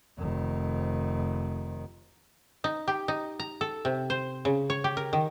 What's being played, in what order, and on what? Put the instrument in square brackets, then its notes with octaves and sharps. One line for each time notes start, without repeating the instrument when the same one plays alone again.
[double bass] F1 D#3
[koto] D#4
G4
D#4
A#5
A4
C3
C5
C#3
C#5
G4
A#4
D#3